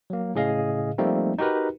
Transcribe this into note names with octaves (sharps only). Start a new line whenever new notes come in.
F#3 A#3
A2 C#3 G#4 D#5 F5
F3 G3 A3 A#3 C4 D#4
D#4 F#4 G4 A#4 B4